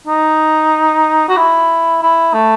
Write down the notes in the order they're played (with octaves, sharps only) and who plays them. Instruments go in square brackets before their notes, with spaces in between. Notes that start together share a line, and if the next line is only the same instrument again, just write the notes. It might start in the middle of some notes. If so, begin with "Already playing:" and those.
[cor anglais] D#4
F#4
E4
E4
A3